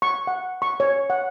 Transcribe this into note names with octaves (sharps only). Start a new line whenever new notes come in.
C#6
F#5
C#6
C#5
F#5